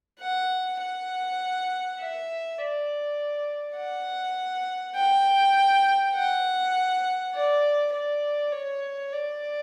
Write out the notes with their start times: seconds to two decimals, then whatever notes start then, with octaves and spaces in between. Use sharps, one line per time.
0.20 F#5
0.80 F#5
1.99 E5
2.58 D5
3.77 F#5
4.96 G5
6.15 F#5
7.34 D5
7.93 D5
8.52 C#5
9.13 D5